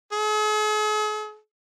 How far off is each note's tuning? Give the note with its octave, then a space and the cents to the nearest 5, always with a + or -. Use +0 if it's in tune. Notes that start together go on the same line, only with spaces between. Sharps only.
G#4 +45